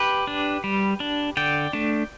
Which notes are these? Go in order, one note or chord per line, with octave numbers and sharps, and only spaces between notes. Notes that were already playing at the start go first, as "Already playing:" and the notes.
Already playing: G4 B4
D4
G3
D4
D3 D5 G5
A3 D4